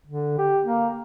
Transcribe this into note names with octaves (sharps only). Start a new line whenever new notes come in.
D3
G4
A#3